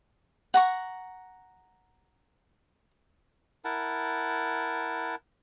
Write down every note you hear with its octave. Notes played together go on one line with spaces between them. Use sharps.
F#5 A#5 C#6
E4 A#4 F#5 A5